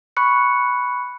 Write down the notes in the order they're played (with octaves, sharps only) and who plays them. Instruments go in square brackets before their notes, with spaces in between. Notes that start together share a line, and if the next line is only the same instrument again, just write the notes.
[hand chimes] B5 C#6 F#6 C#7